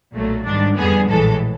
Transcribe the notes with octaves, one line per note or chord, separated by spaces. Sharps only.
B1 A#2 F#3 A3
G#2 D#3 G3 D4
F2 D3 G3 B3 G#4
A#1 A2 E3 G#3 A4